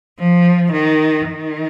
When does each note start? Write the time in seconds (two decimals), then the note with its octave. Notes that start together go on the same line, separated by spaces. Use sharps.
0.19 F3
0.73 D#3
1.27 D#3